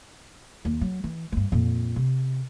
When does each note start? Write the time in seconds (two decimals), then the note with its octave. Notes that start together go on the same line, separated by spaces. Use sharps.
0.65 D#2
0.81 F#3
1.04 E3
1.32 G2 G#3
1.52 F2 A#2
1.96 C3